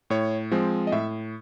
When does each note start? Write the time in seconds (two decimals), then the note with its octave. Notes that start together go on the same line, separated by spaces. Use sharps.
0.10 A2 C#5
0.51 F3 G#3 C4
0.87 D#5
0.92 A2 E5